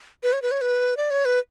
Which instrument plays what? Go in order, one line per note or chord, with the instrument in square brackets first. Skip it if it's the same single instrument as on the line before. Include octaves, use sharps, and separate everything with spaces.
[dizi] B4
C#5
B4
C#5
B4
D5
C#5
B4